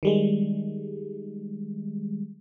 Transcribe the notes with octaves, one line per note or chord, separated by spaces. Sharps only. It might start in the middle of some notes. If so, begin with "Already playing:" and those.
D#3 G3 G#3